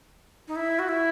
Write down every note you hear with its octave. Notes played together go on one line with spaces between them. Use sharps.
D#4
E4
F#4
E4